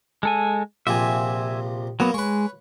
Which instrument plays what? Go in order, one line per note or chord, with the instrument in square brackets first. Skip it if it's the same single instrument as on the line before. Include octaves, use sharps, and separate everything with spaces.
[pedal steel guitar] G#3 A4 G#5
[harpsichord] A#1 C3 F3 [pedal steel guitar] E5 G#5
[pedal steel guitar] F#3 B3 [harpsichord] A#3
[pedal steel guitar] G#3 [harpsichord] B4 C#5